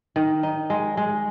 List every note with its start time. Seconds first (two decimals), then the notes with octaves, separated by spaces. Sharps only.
0.16 D#3
0.43 D#4
0.70 G#3
0.97 G#3